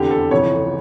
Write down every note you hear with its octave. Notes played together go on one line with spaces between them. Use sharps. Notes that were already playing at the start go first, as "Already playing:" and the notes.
Already playing: F1 E2 D3 G4
A4
G1 F2 C#3 E3 C#5